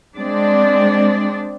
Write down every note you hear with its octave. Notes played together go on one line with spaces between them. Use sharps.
G#3 C4 D4 D5